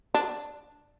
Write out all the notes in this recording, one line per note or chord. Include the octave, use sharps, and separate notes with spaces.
D4